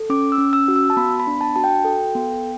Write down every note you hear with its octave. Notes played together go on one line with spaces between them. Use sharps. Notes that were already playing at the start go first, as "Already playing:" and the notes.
Already playing: A4
C#4 D6
E6
C#4
E6
F#4
E6
A5
B3 B5
B5
D4
A5
F#4 A5
G5
A4
B3